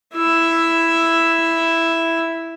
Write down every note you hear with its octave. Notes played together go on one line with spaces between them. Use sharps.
E4 E5